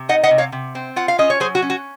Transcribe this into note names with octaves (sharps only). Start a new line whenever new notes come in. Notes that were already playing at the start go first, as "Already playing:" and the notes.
Already playing: C3
D#4 D#5 F#5
D#5 F#5
C3
C#5 F5
C3
C4
F4 F#5
F5
C#4 D#5
C#5
F#3 G#4 C5
F#4
C#4
F#4